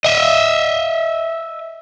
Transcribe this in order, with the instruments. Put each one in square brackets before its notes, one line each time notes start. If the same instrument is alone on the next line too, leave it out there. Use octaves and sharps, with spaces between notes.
[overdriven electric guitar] D#5 E5